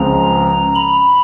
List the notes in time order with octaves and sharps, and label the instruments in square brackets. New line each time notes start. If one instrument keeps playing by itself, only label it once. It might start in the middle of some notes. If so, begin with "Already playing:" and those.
Already playing: [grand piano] C#2 C#3 F3 G#3 C4 [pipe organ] A#5
[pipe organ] B5